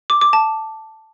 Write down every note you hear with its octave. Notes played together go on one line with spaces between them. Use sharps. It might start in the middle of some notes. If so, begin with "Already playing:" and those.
D6
D6
A5